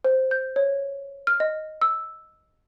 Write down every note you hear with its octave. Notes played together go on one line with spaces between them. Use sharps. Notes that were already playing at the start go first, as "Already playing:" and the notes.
C5
G6
C#5
F6
D#5
E6